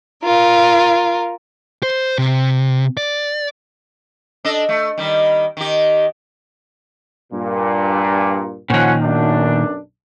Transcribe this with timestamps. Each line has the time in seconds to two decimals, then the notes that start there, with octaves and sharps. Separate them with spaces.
0.24 F4 A#4
1.83 C5
2.18 C3
2.97 D5
4.45 D4 A4 D#5
4.69 A3
4.98 D#3 G3
5.57 D#3 G4
7.33 G2 A#2
8.70 A#2 D#3 F3 C#4 F#5
9.02 B1 F#2 D4